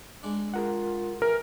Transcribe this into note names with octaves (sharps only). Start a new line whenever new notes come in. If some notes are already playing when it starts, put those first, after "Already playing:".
G#3 D4
F4 G#4 A#4 F#5
E3 A#4